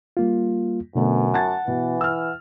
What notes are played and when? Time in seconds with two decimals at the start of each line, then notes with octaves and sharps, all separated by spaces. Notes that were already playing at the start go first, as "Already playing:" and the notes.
0.17 G3 A#3 F4
0.95 F#2 B2 D3 A3 B3
1.34 F#5 A5 A6
1.68 B2 E3
2.01 E6 F6